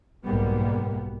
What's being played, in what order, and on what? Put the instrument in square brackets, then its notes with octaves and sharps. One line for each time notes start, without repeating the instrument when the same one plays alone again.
[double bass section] F#1 B1 G#2 G3 A#3 B3